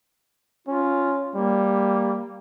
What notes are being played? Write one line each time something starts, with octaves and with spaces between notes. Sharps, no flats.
C#4 F4
G3 A#3